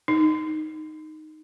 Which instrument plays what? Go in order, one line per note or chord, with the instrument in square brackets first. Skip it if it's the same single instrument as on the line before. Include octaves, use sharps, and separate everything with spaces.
[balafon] D#4